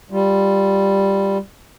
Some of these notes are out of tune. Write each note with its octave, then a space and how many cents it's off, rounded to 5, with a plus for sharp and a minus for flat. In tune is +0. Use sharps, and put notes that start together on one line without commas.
G3 +0 F4 +0